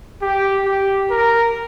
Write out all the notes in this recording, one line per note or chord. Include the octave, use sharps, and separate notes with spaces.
G4
G4
A#4